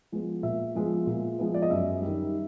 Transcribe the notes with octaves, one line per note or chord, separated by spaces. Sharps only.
F3 G#3 B3
A#2 E5
F3 G#3 B3
A#2
F3 G#3 B3
D5
D#5
F#2 E5
D#3 G3